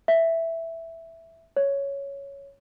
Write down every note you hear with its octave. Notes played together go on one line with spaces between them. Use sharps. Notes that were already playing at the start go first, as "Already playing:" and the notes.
E5
C#5